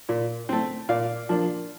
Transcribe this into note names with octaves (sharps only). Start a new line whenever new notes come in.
A#2
A3 C4
A#2 D5 F5
F3 A#3 D4